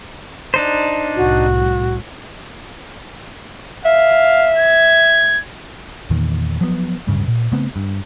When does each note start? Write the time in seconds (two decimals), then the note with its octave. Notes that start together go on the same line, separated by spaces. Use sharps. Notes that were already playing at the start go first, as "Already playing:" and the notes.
0.54 D4 D#4 C5
1.16 C2 A2 F#4
3.85 E5 F5
4.58 G#6
6.10 E2 A#2 D#3
6.61 F3 F#3 B3
7.07 D1 G2 C#3 C#4
7.28 A#2
7.52 C#3 A3 B3 C4
7.76 G2